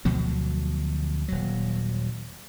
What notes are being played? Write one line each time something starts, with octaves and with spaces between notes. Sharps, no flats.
D2 B2 F3 F#3
D#1 F#3